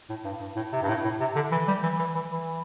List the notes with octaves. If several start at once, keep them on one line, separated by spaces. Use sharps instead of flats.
A2
G2
G2
A2
C3
G2
A2
A2
C3
D3
E3
G3
E3
E3
E3
E3